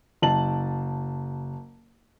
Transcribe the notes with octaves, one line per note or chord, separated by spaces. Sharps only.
F#1 A5 F#7